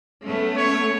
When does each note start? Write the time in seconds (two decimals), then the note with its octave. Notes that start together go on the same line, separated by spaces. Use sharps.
0.23 A3 B3 C#4
0.56 C#5